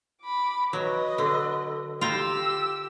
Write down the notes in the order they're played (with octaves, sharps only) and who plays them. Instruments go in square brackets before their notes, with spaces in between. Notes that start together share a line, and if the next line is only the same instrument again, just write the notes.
[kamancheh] B5 D6
[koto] F#3 [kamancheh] B4 D#5
[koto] D3
[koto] F4 G5 A#5 [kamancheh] G4 E6